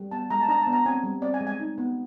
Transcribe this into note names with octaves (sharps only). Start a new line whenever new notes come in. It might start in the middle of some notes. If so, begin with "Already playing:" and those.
Already playing: G3
B3 A5
G#3 A#5
A5
D4 A#5
A5
B3
A#5
C4 G#5
G3
C4 D5
G#5
G#3
G#5
D#4
B3